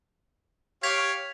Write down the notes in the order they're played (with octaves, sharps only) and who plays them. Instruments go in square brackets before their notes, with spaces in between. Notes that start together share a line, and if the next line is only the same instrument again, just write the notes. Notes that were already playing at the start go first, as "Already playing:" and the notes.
[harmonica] G4 C#5 F5 [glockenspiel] G#6 B6 F7